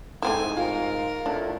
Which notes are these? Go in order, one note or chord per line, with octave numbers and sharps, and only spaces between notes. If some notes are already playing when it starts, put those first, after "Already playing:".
G#2 A3 C4 E4 G#5
F4 A#4
A2 D4